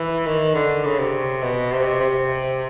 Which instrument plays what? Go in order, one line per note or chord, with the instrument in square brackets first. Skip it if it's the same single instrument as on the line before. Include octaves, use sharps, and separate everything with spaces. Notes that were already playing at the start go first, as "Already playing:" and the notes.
Already playing: [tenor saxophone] E3
D#3
D3
C#3
C3
B2
C3
C3